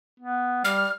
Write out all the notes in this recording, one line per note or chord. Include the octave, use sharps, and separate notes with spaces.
B3
G3 F6